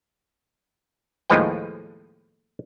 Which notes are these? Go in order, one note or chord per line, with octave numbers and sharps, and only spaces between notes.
D#2 A2 F3 G#3 B4 G5